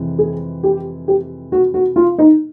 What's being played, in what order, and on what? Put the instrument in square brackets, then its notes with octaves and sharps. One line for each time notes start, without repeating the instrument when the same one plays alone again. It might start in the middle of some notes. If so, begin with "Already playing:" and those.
Already playing: [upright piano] F2 C3 E3 G#3
[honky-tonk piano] G#4
G4
G4
F#4
F#4
F4
D#4